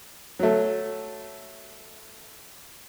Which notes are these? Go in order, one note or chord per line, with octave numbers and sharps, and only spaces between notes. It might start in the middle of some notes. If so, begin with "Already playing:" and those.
F#3 A3